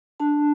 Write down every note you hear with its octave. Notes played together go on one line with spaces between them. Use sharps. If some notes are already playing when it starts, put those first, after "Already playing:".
D4 A5